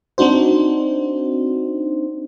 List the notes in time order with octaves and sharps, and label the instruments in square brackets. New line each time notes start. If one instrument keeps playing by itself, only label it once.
[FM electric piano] C4 D4 D#4 F#4 C5